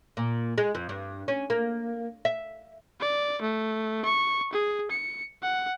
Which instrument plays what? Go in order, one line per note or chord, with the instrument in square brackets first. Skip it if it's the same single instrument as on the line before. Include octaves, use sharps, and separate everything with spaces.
[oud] A#2
G#3
F2
G2
C#4
A#3
E5
[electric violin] D5
A3
C#6
G#4
C#7
F#5